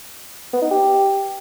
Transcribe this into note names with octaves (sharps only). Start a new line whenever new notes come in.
B3
D#4
G4